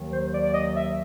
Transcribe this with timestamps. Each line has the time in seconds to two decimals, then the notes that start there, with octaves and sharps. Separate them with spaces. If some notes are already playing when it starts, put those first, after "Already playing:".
Already playing: D#2 D#3 F#3
0.12 C5
0.33 D5
0.45 D5
0.54 D#5
0.76 E5